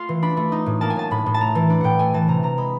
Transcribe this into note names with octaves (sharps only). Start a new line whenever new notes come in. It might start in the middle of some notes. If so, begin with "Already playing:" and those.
Already playing: A3 F4 C6
E3
D4 B5
A3
D#4
A2
A#3 A5
G#5
F#3 A5
A2 B5
A2
A5
A3 A#5
E3
D4 B5
A2 F#5 G5
A3 G#5
E3 A5
C3 A#5
C3 A#5
G#3 B5